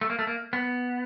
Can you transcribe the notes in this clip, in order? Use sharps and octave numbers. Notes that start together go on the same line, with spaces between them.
A3
A#3
A3
A#3
B3